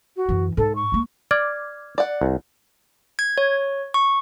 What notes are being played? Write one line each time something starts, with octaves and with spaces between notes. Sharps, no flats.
F#4
F#2 E3
G#2 A4
C#6
G#3 A#3
D5 D6 F6 G#6
D5 F#5
C2
G#6
C#5
C#6